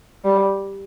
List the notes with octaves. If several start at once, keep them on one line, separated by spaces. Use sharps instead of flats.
G3